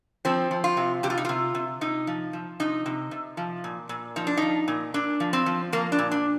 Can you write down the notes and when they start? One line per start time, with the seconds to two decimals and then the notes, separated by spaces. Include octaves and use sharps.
0.25 F3 C4
0.51 F3
0.64 F4
0.77 C3
1.03 C3 G4
1.10 F4
1.17 D#4
1.25 C3 F4
1.55 C3
1.81 C3 D#4
2.07 F3
2.33 F3
2.60 C3 D#4
2.86 C3
3.11 C3
3.37 F3
3.64 A#2
3.89 A#2
4.16 F3 D#4
4.27 D4
4.37 F3 D#4
4.68 A#2
4.94 A#2 D4
5.20 F3
5.33 C4
5.46 F3
5.72 F3 A#3
5.92 D4
5.98 A#2
6.11 D4